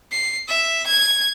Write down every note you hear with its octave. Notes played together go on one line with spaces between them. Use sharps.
C7
E5
G#6